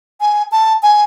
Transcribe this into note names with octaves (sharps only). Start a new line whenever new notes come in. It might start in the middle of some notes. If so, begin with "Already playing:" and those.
G#5
A5
G#5